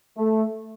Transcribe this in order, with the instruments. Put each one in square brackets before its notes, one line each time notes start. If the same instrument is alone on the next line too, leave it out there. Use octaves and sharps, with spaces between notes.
[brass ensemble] A3